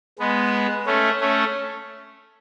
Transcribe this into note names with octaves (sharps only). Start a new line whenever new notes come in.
G#3 B3
A3 C#4
A3 C#4